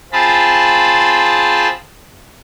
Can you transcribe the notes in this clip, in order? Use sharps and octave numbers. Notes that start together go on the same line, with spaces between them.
C4 F4 G#4 A5 B5